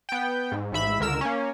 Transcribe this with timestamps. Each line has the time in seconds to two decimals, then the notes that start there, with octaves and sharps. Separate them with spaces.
0.09 B3 G5
0.52 G#2
0.72 A1 G#2 E5 B5
1.00 C#2 D3 A#4 E6 E7
1.21 A#3 C#4